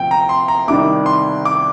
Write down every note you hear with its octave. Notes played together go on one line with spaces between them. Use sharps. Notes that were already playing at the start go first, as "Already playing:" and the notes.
Already playing: D2 C3 F3 G5
A#5
C6
A#5
C2 C3 D#3 G3 D6
C6
D6